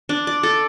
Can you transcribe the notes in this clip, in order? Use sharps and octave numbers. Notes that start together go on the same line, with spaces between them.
D4
D5
A4